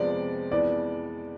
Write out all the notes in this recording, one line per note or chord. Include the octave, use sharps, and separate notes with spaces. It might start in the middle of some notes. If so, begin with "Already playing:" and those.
Already playing: F2 C3 F3 G#3 B3 D5
F2 E3 G#3 B3 D5